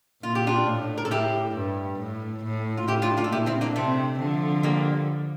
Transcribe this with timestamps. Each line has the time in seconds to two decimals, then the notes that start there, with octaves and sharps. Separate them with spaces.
0.23 A#2 F4
0.35 G4
0.47 D4 F4
0.67 A2
0.97 A#4
1.05 A4
1.11 A2 E4 G4
1.55 G2
1.99 A2
2.44 A2
2.77 F4
2.88 A2 E4 G4
3.02 D4 F4
3.17 D4 F4
3.24 A4
3.31 A#2 E4 G4
3.46 C4 E4
3.61 A#3 D4
3.76 C3 A3 C4
4.19 D3 F3
4.63 G3 A#3